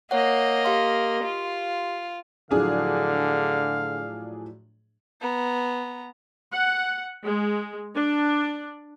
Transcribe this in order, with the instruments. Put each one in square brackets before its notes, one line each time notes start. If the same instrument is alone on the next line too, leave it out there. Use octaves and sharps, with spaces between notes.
[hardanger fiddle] A#3 D#5 [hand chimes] C#5 F#5
[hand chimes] G4 F5 C6
[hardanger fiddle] F4
[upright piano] A2 F3 F#3 [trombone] D3 [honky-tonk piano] D4 G#4 [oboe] F5
[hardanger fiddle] B3 A#5
[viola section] F#5
G#3
D4